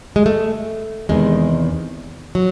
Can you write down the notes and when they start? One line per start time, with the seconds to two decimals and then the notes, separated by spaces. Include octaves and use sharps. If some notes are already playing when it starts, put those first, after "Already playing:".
0.16 G#3
0.26 A3
1.09 E2 C3 D#3 G#3
2.35 F#3